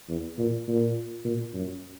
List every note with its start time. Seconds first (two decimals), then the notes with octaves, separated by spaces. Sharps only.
0.09 E2
0.39 A#2
0.68 A#2
1.25 A#2
1.54 F#2